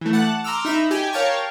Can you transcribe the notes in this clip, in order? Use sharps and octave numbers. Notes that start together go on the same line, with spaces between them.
E3 A3
F#5 A5 D6 F#6
A#5 C6 D6 E6 F6
D#4 E5 A#5 B5
G4 G5 G#5
A#4 C#5 F5 G5 A5 C#6